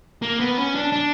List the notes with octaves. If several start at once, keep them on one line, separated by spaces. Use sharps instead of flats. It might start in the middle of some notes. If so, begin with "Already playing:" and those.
A#3
B3
C#4
D4
D4